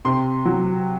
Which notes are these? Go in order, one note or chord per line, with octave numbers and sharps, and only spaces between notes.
C3 C6
F#3